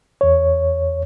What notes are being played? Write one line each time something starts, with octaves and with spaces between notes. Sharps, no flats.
E2 C#5